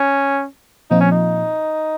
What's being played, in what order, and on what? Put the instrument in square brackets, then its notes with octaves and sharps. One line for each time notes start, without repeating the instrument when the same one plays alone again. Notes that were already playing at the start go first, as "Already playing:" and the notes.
Already playing: [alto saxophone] C#4
[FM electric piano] A#2 F3 C4 F4 [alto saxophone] D#4
[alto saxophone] C#4
D#4